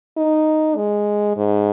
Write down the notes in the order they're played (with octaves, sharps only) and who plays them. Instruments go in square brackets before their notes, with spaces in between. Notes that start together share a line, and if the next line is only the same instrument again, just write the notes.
[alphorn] D#4
G#3
G#2